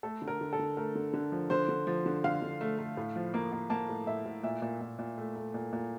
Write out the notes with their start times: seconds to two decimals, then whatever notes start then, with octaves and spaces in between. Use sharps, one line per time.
0.03 A3 A4
0.22 D3
0.28 A#4
0.41 D3
0.53 A4
0.59 D3
0.77 A3 A#4
0.95 D3
1.13 D3
1.32 F3
1.50 D3 C5
1.69 D3
1.87 F3
2.06 D3
2.24 D3 F5
2.42 D3
2.61 A3
2.78 A3
2.97 A2
3.16 F3
3.34 A#3
3.52 A#3
3.70 A#3 A5
3.89 A2
4.07 A2 E5
4.25 A2
4.43 A#2 E5
4.62 A#2
4.81 A#2
4.99 A#2
5.18 A3
5.36 A3
5.54 A#2
5.73 A#2